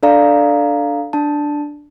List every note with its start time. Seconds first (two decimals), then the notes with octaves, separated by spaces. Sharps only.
0.03 D4 A4 D5 F5 A#5
1.13 D4 A5